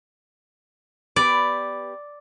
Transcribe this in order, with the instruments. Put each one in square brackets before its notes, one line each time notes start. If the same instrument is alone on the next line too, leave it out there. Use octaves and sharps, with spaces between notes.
[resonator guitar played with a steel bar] B3 G4 B4 [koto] D5